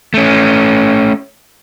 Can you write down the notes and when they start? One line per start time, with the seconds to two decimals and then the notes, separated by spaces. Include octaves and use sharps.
0.14 A3 C#4